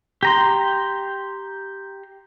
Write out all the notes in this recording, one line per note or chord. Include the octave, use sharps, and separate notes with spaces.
G4 A#5 C6